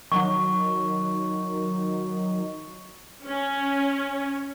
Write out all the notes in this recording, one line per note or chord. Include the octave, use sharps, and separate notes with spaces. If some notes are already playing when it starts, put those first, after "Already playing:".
D#3 F#3 D#4 C#6
C#4